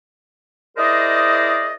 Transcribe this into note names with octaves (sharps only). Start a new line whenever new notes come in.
E4 G#4 A#4 C5 D5 D#5